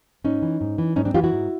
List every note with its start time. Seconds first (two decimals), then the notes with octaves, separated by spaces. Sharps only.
0.24 G#2 C#4 D#4
0.42 E3
0.61 G#2
0.78 E3
0.96 G#2 C#4 D#4
1.05 C4 D4
1.14 E3 F4 G4
1.24 E4 F#4
1.32 G#2